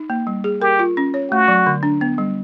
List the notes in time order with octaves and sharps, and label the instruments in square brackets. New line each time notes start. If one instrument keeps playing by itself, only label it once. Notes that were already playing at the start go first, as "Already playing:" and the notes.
Already playing: [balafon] D#4
A#3
G3
G#4
[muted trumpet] G4 [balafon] A#4
[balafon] F4
C#4
C#5
[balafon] A3 [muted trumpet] F#4
[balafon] F#3
D3
D4
B3
G3